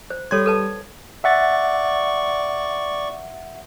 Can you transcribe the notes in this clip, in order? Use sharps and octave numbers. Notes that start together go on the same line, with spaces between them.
C5
G3 A4 C#5 C6 G#6
A4 B4 A5
D5 E5 F#5 C#6 A6